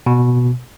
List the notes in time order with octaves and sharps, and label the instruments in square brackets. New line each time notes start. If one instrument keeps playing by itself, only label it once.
[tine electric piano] B2